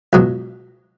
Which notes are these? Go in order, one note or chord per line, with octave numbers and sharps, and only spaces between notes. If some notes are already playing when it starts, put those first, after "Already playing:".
C#2 B2 F#3